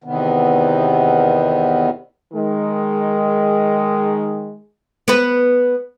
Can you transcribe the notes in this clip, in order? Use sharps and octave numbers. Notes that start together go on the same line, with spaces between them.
E2 C3 D#3 B3
D#3 G#3
B3 B4